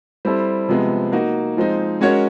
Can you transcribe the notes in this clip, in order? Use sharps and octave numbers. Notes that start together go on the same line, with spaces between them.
G3 C4 E4 A4 C5
C3 F3 G#3 B3
A#3 D#4 F#4
F3 G#3 C4 D#4
G#3 C#4 F#4 A#4 C#5